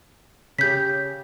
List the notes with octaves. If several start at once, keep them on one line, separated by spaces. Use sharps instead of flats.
C#3 G4 G6 B6